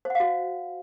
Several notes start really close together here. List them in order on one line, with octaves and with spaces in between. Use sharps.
C5 F#5 F5 F#4